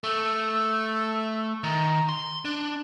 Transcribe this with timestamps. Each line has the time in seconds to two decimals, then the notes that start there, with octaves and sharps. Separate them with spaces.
0.04 A3 E6
1.64 D#3 A#5
2.09 C6
2.45 D4 F#6